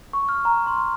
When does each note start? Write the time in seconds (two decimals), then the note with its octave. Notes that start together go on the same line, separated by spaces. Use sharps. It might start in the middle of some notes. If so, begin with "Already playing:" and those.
0.13 C#6
0.29 F6
0.45 A#5
0.67 C6